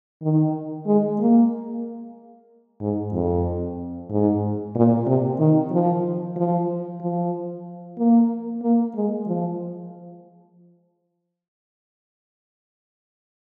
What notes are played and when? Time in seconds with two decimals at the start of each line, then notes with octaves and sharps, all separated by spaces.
0.22 D#3
0.86 G#3
1.20 A#3
2.81 G#2
3.13 F2
4.10 G#2
4.75 A#2
5.07 C3
5.39 D#3
5.71 F3
6.36 F3
7.01 F3
7.98 A#3
8.62 A#3
8.95 G#3
9.27 F3